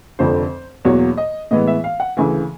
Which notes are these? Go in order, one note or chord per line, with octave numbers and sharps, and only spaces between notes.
F1 F2 D3 F3 C5
E2 B2 F#3 A#3 C#5
D#5
A2 E3 G#3 B3 D#5
E5
F5
F#5
D2 C#3 E3 G#5